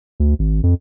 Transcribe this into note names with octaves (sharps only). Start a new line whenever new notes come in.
D2
G#1
F2